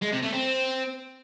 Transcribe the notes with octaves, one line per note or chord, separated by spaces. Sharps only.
G#3
C3
A3
C4